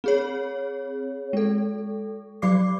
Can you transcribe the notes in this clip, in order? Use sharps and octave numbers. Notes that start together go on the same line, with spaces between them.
C4 G#4 C#5
G#3 A4
F#3 G4 D5 D6 C7